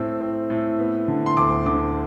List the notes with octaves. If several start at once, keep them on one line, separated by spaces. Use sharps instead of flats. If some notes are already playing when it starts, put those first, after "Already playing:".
Already playing: A2 C4 E6
C4
A2
B3
D3
C6
D2 D6
D3 D6